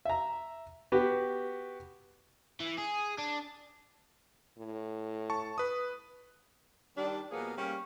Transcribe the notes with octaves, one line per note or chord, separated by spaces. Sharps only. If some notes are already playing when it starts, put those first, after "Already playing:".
E5 A#5
B3 F#4 G4
E3
G#4
D4
A2
A5 C#6
B4 D#6
D#3 G3 D4
B2 F3 A#3 B3 G#4
G3 A#3 C#4 F5